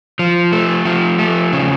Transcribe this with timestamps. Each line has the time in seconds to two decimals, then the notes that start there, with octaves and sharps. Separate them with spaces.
0.19 F3
0.52 A3
0.85 F3
1.19 A3
1.52 C#3